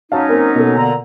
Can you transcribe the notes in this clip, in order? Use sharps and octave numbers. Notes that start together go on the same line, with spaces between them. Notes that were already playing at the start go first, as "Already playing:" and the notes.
F#3 C#4 D#4 F5 A5
A#3 C4 A#4
B2 A#3 A4
A#2 D3 A#5